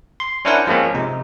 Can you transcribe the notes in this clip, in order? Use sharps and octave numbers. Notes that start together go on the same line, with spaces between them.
C6
C#4 D4 E4 A#4 C5 F#5
F3 G#3 A#3 C4 C#4
C3 D#4